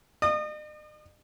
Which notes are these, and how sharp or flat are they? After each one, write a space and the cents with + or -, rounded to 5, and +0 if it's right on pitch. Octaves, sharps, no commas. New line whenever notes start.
D#5 -45 D#6 -30